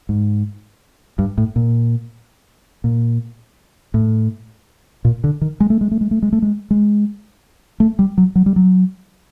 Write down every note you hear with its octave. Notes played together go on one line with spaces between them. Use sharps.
G#2
G2
A2
A#2
A#2
A2
A#2
D3
D#3
G#3
A3
G#3
A3
G#3
A3
G#3
A3
G#3
G#3
A3
G3
F#3
F#3
G3
F#3